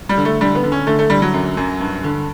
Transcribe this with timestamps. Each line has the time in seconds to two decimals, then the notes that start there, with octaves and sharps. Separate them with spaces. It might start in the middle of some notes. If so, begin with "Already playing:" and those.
0.09 G3
0.17 D3
0.25 A3
0.41 D3 G3
0.55 B3
0.64 D3
0.72 C#4
0.87 D3 A3
0.99 A3
1.10 D3 G3
1.22 F#3
1.34 F#2
1.57 F#2
1.81 G2
2.04 D3